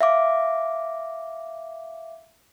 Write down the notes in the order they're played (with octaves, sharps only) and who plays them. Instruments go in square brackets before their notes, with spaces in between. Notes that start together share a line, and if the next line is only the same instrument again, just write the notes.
[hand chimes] E5 F5 D6